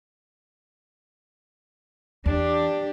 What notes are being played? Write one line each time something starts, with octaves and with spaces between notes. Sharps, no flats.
E2 D4 G4